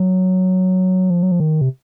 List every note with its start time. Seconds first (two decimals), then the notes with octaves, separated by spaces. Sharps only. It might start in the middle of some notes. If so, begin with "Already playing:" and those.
Already playing: F#3
1.10 F3
1.23 F#3
1.32 F3
1.40 D#3
1.61 C3